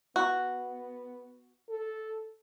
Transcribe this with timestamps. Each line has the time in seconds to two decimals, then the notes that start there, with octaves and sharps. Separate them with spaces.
0.16 B3 F#4
1.69 A4